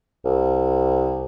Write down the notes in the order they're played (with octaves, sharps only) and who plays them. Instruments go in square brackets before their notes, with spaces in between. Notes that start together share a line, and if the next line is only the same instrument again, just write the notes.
[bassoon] C2